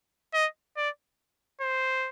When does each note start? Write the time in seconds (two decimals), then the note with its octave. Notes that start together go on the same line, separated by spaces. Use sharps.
0.34 D#5
0.77 D5
1.61 C5